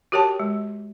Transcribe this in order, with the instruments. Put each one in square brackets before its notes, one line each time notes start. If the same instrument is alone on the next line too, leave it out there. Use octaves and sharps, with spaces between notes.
[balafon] F#4 G4 A#4 C#5 G5 A5
G#3